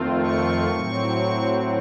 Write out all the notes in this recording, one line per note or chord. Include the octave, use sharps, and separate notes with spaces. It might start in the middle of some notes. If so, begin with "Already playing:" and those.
Already playing: F2 D#3 A3 C4 F4
C#6
A2 F#3 C4